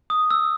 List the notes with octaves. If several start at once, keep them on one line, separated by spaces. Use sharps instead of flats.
D#6
E6